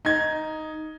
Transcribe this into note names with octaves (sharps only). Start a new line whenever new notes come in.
D#4 G#6